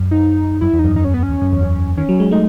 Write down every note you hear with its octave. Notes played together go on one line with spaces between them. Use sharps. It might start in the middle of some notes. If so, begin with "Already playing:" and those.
Already playing: F#2
D#4
F#2 E4
E2
D#4
F#2
F#2 D#4
C#4
B3
C#4
E2
F#2
E2
F#2
D#3 C#4
F#3
G#3
A3 D#4